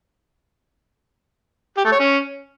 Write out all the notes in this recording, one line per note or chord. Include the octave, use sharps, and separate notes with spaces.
G4
A3
C#5
C#4